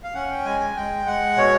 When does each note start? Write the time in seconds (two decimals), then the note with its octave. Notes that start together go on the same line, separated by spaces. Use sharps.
0.04 F5
0.14 C#4 F#5
0.30 G5
0.45 G#3 G#5
0.60 G#5
0.76 G#3 G5
1.06 G#3 F#5
1.36 B2 C#5